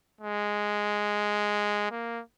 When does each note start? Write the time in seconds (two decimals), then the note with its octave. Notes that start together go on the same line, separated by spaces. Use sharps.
0.21 G#3
1.91 A#3